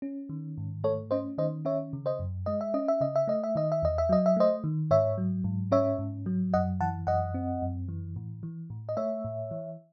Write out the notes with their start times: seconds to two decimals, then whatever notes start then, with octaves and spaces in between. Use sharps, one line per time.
0.02 C#4
0.29 D#3
0.58 G#2
0.84 A3 A4 C#5
1.11 C#4 C5 D#5
1.38 D#3 C5 D#5
1.65 C#4 C#5 E5
1.93 C#3
2.06 C5 D#5
2.19 F#2
2.46 G#3 D#5
2.61 E5
2.74 C#4 D#5
2.88 E5
3.01 C#3 D#5
3.16 E5
3.27 A3 D#5
3.44 E5
3.55 D#3 D#5
3.72 E5
3.83 E2 D#5
3.98 E5
4.09 F#3 D#5
4.26 E5
4.36 A3 C5 D#5
4.64 D#3
4.91 G#2 C#5 E5
5.18 F#3
5.44 G#2
5.72 C#4 C#5 E5
5.99 G#2
6.26 F#3
6.54 F#2 D#5 F#5
6.81 E3 F#5 A5
7.07 F#2 D#5 F#5
7.34 C4
7.62 F#2
7.88 E3
8.16 A2
8.43 E3
8.70 A2
8.89 D#5
8.97 A3 C#5 E5
9.24 A2
9.51 E3